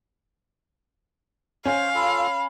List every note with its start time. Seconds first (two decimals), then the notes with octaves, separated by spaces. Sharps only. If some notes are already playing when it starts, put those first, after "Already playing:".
1.65 C#4 C5 F5
1.95 F4 A4 B5